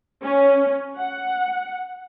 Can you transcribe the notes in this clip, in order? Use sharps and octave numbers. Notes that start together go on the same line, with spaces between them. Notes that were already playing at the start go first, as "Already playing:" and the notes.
C#4
F#5